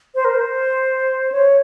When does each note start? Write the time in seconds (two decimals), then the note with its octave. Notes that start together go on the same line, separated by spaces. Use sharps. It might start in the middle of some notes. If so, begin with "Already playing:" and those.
0.15 C5
0.25 A#4
0.34 C5
1.32 C#5